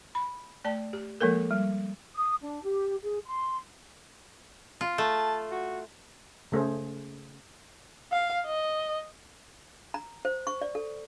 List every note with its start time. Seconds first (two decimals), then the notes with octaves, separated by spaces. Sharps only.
0.15 B5
0.64 A3 D5 A5
0.93 G4
1.21 F3 G#3 A#3 A4 A#4
1.51 G3
2.15 D#6
2.40 D4
2.64 G4
3.02 G#4
3.25 C6
4.81 F4
4.98 A3 A5
5.51 F#4
6.52 C#3 A3 G#4 C5
8.12 F5
8.46 D#5
9.94 A#5
10.25 C5
10.47 C#6
10.62 D5
10.75 A4